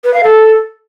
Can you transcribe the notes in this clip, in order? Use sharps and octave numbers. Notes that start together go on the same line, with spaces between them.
B4
F5
A4